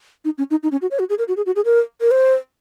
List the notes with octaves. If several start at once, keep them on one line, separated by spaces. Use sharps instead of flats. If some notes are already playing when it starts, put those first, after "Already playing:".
D#4
C#4
D#4
D#4
C#4
F#4
C#5
F#4
G#4
A#4
F#4
G#4
F#4
G#4
A#4
A#4
C5